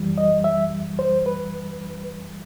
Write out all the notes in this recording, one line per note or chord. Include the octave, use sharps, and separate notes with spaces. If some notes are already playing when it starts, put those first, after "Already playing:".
Already playing: F#2 E3 G3
D#5
E5
C5
B4